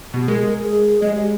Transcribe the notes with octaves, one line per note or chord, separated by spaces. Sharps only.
B2 G4
G#3 A#4
G#4
G#3 D#5
G4